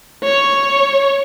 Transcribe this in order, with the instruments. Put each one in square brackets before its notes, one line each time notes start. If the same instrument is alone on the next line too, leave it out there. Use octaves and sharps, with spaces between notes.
[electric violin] C#5